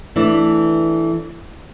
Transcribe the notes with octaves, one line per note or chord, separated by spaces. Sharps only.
E3 A3 D4 E4